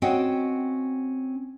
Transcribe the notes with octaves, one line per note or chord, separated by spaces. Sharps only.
C4 C#4 F#4 D#5 F#5 G5